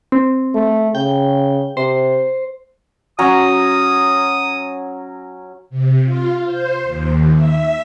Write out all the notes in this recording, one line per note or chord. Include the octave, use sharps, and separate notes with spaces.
C4
A3
C#3 G5
C3 C5
F#3 C#4 A#5 D#6
C3
F4
C5
D#2
E5